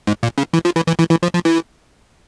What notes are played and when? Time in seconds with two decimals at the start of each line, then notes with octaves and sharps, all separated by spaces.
0.07 G#2
0.23 A#2
0.38 C#3
0.53 E3
0.65 F3
0.76 E3
0.88 E3
0.99 E3
1.10 E3
1.23 F3
1.34 F3
1.45 E3